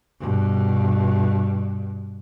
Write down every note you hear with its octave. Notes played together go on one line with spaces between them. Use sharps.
G2 B2